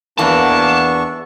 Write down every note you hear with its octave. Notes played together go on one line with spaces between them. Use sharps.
E2 E3 A#3 B3 D4 A5 C#6